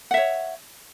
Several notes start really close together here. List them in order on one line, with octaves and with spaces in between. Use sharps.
F#5 E5 C#5